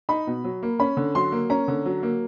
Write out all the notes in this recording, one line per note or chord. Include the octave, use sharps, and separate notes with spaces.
D#4 B5
B2
F#3
A#3
C#4 B5
D3
F#3 C6
A#3
C#4 A#5
D3
F#3
A#3